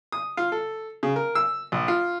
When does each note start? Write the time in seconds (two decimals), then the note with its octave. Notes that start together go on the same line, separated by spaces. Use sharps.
0.12 D#6
0.37 F4
0.52 A4
1.03 C#3
1.16 A#4
1.35 E6
1.72 A#1
1.88 F4